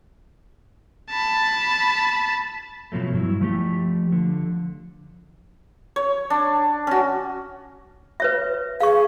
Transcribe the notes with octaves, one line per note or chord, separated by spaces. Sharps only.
A5 B5
B2 F3 F#3 A3
G2 F#3 E4
F3 A3 G4
D3 F3
C#5
D4
C#4 F#4
B4 C#5 E5
G#4 F5 C#6